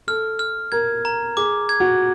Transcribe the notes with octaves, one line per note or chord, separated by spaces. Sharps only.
A4 F6
F6
A#4 G#6
A#5
G#4 D6
G#6
F#4